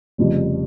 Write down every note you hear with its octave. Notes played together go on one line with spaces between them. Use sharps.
F1 F2 C#3 G3